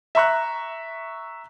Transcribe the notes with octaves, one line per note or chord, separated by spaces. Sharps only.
E5 A#5 C#6 F#6